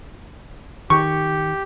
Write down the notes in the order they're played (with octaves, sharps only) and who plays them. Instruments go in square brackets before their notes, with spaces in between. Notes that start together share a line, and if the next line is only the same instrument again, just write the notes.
[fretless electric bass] D#3 [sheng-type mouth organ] G4 [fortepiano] C#6